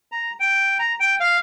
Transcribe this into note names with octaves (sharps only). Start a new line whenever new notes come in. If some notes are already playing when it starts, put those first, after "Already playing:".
A#5
G5
A#5
G5
F5